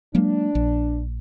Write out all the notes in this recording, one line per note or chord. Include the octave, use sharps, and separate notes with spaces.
F#3 G#3 A#3 D4
A#1